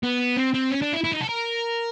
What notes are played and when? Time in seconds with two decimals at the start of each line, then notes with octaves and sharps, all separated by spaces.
0.03 B3
0.37 C4
0.54 C4
0.70 C#4
0.82 D4
0.93 E4
1.04 E4
1.12 D#4
1.21 A4
1.29 A#4